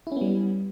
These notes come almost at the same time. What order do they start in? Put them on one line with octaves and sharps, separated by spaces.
E4 C#4 B3 G3